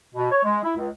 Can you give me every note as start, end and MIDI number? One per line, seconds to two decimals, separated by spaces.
0.15 0.31 47
0.31 0.42 73
0.43 0.61 56
0.64 0.77 64
0.77 0.89 37